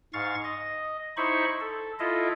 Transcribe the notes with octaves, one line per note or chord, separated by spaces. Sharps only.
G#2 F5 C#6 A6
D#5
D#4 E4 C5 B5 C#6
A4
E4 F4 A4 D#5 E5